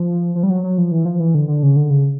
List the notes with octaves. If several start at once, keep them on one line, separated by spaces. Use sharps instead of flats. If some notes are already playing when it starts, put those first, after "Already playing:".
Already playing: F3
F3
G3
F#3
F#3
F3
E3
F3
E3
D3
D3
C#3
D3
C#3